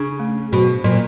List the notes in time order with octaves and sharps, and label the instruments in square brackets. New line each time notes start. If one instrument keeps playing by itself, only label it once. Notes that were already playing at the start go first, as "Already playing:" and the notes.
Already playing: [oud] C#3 [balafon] D4
[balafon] A3
[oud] B2 [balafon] F#3
[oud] A#2 [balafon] F#3